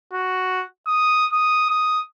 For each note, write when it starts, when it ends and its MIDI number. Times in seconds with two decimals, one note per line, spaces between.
0.13 0.64 66
0.87 1.27 87
1.32 1.65 87
1.69 2.02 87